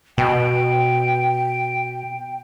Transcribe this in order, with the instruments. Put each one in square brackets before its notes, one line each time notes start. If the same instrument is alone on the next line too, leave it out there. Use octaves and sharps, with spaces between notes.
[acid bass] B2 [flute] G5